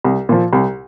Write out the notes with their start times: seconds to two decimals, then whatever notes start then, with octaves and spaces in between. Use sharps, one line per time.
0.04 C2
0.29 A#2 F3
0.53 C2